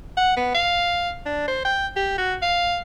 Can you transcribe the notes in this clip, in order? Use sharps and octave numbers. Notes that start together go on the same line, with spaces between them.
F#5
B3
F5
D4
C5
G5
G4
F#4
F5